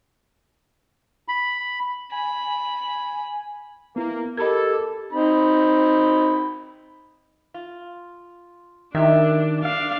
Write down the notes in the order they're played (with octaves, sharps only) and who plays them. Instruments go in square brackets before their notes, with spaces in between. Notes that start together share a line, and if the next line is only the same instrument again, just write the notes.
[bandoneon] B5
[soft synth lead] G#5 [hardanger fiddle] B5
[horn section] A#3 [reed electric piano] B3 E4
[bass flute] G4 [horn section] A4 [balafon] A#4 B5 [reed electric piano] D#5 G#6
[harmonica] C4 D#4 B5
[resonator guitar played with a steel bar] F4
[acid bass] D#3 [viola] D4 [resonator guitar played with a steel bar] E4 G4 E5
[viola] D4 F5